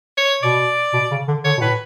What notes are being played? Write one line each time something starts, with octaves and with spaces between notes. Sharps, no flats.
C#5
B2 D5
B2
C#3
D3
D3 C#5
B2
A2 B4